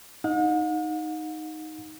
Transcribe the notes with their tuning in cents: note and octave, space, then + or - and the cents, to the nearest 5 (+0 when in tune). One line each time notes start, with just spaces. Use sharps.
D#4 +0 F#5 -45